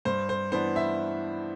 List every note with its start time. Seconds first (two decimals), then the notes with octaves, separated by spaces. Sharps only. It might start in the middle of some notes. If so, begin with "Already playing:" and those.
0.05 G2 C5
0.29 C5
0.52 E3 B3 D4 C5
0.76 E5